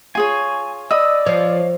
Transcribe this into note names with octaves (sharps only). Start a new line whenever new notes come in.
F4 G#4 C#5 G#5
D5 D#5 B5 D#6 E6
F3 C#5 F5